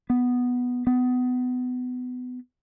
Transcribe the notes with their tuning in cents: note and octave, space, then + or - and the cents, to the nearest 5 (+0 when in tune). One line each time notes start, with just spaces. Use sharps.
B3 +0
B3 +25